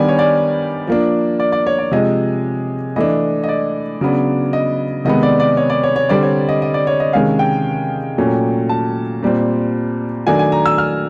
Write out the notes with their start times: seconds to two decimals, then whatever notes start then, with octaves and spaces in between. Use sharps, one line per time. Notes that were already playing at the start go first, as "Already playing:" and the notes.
Already playing: D#3 G3 B3 D4 G#5
0.09 C#5
0.19 D5
0.87 F3 A#3 D4
1.40 D5
1.52 D5
1.67 C#5
1.79 D5
1.91 C3 F3 G#3 D#5
2.96 E3 A3 D4 D#5
3.44 D#5
3.49 D5
4.01 C#3 F#3 B3 D4
4.53 D#5
5.05 C3 D#3 G#3 B3 D#5
5.23 D5
5.40 D5
5.57 C#5
5.70 D5
5.83 C#5
5.96 C#5
6.09 D3 G3 C4 D5
6.23 C#5
6.49 D#5
6.62 D#5
6.74 D5
6.87 C#5
7.00 D#5
7.13 C3 D#3 G#3 C#4 F5
7.39 G5
8.18 A#2 F#3 A3 C#4
8.69 A5
9.23 A#2 G3 C4
10.27 D#3 F#3 A3 D4 G#5
10.39 G#5
10.52 A#5
10.66 E6
10.78 F6